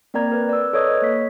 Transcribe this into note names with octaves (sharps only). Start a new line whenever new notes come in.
A#3 C4 A#4 D5 A#5 G#6
A#4 B4
D5 E6
A4 B4 C#5 D#5 D#6 G#6
A#3 C#5 B6